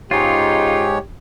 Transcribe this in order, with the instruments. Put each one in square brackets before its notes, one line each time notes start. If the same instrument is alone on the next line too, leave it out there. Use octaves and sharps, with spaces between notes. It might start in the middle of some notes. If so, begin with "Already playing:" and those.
[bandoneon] G#2 G#3 C#5 [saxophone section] C#3 D#4 [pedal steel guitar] F4 [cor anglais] G4